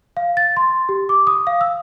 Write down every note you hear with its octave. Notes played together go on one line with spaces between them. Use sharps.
F5
A6
C6
G4
D6
D#6
F5
E6